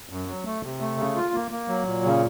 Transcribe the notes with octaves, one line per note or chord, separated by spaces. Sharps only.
F#2
F#3
A3
C3
A3
C#3
F4
A#3
A#3
F#3
A#2
C#3